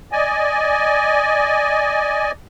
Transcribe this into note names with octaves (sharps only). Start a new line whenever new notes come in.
D5 D#5 G#5